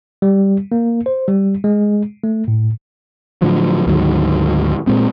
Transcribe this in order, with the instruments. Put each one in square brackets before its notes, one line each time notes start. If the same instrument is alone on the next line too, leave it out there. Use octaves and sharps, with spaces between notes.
[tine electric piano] G3
A#3
C5
G3
G#3
A3
A2
[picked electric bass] A2 D3 F3 F#3
D2 G#2 D#3 F#3
A#2 G#3 C4